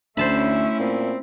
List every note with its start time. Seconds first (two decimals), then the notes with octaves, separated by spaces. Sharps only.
0.17 D2 A3 C#4 E4 C5 E5 A5 B5
0.80 A#2 C4